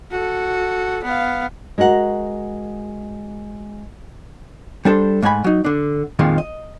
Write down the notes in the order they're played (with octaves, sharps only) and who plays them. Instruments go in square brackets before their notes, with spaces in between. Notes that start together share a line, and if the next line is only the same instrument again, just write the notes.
[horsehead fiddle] F#4 A4
B3 F5
[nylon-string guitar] G#3 F#4 A#4 F#5
[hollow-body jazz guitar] G3 D4 A4 C5
G#2 G#3 A3 G#5 B5
F#3 D#4
D3 D4
F2 A#2 D#3 F3 G#3
D#5